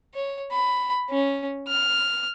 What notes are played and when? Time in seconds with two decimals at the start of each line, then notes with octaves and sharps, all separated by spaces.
0.15 C#5
0.52 B5
1.10 C#4
1.68 F6